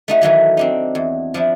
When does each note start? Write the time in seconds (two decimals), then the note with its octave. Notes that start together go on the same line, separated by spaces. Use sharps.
0.08 A3 D#4 F#4
0.21 D#3 E3 F#3 A3
0.57 C4 D4 D#4
0.95 E2
1.34 F3 D4 E4